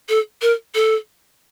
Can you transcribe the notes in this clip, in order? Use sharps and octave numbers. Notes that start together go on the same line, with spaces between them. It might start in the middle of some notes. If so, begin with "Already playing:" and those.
A4
A#4
A4